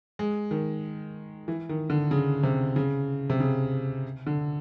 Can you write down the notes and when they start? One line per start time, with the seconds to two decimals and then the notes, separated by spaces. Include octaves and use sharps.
0.19 G#3
0.51 D#3
1.48 E3
1.69 D#3
1.90 D3
2.11 C#3
2.43 C3
2.76 C#3
3.30 C3
3.40 C#3
4.27 D3